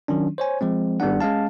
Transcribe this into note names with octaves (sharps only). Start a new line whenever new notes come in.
D#3 F#3 C#4 D4
C5 C#5 G#5
F3 G#3 C4
G#1 G3 B3 D4 F#5
G#3 C#4 F5 A5